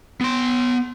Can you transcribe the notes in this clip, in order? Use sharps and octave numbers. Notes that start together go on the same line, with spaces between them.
B3 C6